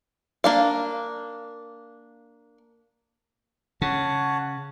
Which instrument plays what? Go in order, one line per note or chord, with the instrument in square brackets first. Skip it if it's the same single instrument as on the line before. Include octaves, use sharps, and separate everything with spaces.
[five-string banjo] A#3 D4 F5
[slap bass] C#3 [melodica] C#5 F#5 A5